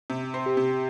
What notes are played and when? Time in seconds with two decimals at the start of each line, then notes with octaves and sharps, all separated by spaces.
0.10 C3
0.34 C4
0.46 G4
0.57 C3